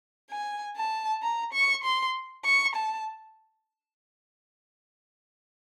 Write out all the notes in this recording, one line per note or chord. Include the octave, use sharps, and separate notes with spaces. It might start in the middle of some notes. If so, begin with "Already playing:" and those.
G#5
A5
A#5
C#6
C6
C#6
A5